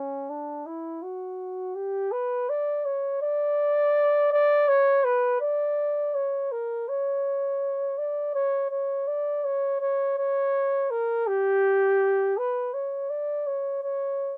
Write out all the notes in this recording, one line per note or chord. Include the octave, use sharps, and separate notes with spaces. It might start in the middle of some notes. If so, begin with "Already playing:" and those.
Already playing: C#4
D4
E4
F#4
G4
B4
D5
C#5
D5
D5
C#5
B4
D5
C#5
A#4
C#5
D5
C#5
C#5
D5
C#5
C#5
C#5
A#4
G4
B4
C#5
D5
C#5
C#5